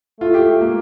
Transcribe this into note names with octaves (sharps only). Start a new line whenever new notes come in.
A3 F4
G4
A#3